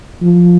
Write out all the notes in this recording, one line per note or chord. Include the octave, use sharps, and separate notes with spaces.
F3